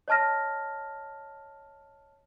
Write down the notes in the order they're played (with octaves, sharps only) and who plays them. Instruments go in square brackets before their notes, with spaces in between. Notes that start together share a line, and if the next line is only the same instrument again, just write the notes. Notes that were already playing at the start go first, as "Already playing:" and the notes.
[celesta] C#5 D#5 A5 F6 A#6